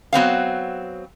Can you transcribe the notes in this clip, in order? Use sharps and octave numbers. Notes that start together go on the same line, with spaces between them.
F#3 B3 C4 F5